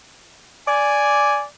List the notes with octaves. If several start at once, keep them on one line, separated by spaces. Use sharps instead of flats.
D5 G#5